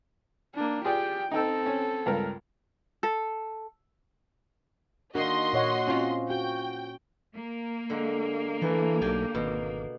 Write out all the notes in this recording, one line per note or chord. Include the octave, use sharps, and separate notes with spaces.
A#3 D4
F4 G4 G#4 D5 G5
C4 D#4 A4 G5 E6
C#4
C#2 G2 A#4
A4
D#3 A#3 D4 F#4 D#5 C6
A#2 C#5 F#5
C4 C#4 F4
F#4 G5
A#3
D3 G#3
E3 A3
B1 G4 D5 G#5
G#1 B2